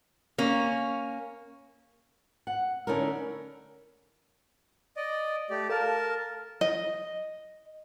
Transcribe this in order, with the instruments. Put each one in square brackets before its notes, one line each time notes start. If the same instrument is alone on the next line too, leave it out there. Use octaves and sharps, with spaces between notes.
[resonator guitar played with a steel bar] A#3 C#4
[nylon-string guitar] F#5
D3 C#4 D#4 E4 A4 A#4
[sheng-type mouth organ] D5 D#5
A3 G4 D5
[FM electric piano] A4 F5 F6 [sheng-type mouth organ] A#4 A5
[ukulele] D#5